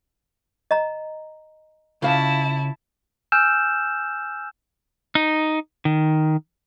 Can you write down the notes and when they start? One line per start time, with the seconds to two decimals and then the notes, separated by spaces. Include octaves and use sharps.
0.71 D#5 A#5
2.02 C#3 E4 F4 F5 A5
3.32 G#5 E6 F6 G6 E7
5.15 D#4
5.85 D#3